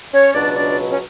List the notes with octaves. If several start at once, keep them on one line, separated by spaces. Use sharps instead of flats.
C#4 C#5
C#2 B2 F#3 D4 D5
D4 D5
C#4